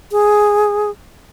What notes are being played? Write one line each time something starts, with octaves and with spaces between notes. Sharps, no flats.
G#4